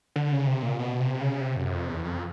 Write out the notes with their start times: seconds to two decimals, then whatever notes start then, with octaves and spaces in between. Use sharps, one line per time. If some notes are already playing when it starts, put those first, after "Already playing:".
0.16 D3
0.32 C#3
0.47 C3
0.62 A#2
0.79 B2
1.00 C3
1.21 C#3
1.41 C3
1.56 F#2
1.73 F2
1.88 E2
2.04 F2